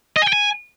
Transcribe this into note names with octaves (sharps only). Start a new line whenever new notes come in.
D#5
G#5
G5
G#5